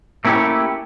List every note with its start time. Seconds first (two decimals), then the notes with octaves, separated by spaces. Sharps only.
0.25 A3 A#3 C#4 E4 G4 C#5